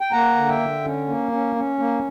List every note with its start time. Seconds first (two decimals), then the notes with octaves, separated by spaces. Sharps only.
0.01 G5
0.12 A#3 F#5 A#5
0.36 D3
0.48 E5 G5
0.60 D3
0.84 C#4
1.08 A#3
1.32 C#4
1.56 C#4
1.79 A#3